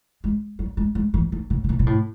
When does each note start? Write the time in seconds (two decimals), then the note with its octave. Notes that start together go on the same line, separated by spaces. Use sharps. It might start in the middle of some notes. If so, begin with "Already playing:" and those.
0.24 G#3
0.59 F#3
0.77 G#3
0.95 G#3
1.14 E3
1.32 D#3
1.50 C#3
1.64 C#3
1.69 B2
1.79 B2
1.87 A2